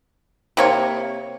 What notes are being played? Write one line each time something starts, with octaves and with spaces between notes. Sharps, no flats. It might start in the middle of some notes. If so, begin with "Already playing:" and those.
C3 A#3 C#5